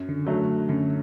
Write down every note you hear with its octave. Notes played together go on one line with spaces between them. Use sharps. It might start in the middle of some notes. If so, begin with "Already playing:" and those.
Already playing: F#2
D3
D3 F#3 A3
F#2 D3